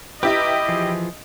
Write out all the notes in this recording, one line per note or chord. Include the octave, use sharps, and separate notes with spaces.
E4 G4 B4 D#5 A#5
E3 F3 G#4